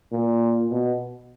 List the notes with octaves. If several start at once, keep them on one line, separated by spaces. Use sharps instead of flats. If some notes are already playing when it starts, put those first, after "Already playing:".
A#2
B2